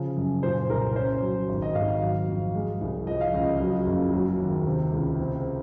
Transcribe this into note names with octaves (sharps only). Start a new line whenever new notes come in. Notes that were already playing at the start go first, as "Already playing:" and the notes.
Already playing: C#3 F3
F#2
A#2 C5
C2 A#4
C#4 C5
F#3
G#1
D#5
G#1 F5
F5
F#3
F2
G#3
C2
F3 D#5
F5
C#2 D#5
F#3 D#5
F#1
F#3
D#2
C3
C#2
C4